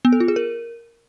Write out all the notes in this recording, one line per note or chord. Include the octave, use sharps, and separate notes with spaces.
B3
A4
F4
G#4
A#4